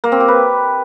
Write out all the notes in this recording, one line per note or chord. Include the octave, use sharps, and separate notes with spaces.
A#3
C4
G4
B4